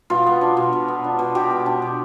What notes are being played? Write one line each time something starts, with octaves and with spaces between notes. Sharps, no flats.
B2 F4
B3
D4
B2
B2
B3
D4
B2
B2 G4
B3
D4
B2